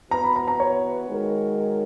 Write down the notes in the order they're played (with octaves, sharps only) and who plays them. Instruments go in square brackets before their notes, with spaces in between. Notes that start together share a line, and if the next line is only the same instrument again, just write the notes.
[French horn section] E3 B3 F#4 B4 [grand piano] A#5
[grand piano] B5
A#5
A#5
C#5
[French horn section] D#3 G#3 D#4 F#4 A#4